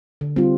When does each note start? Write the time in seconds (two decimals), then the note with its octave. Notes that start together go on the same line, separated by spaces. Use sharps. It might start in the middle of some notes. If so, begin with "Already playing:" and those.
0.21 D3
0.36 G3 C4 F4